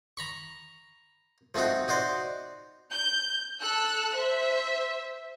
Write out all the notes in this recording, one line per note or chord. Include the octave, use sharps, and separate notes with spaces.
A#5 B5 C#6
F3 A3 C4 D#4 F#4
D#4 F#4 C5 D5
G6
A4 E6 F#6
C5 E5